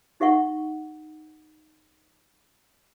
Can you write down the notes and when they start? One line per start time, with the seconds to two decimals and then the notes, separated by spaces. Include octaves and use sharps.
0.20 D#4 G4 E5 F#5 C#6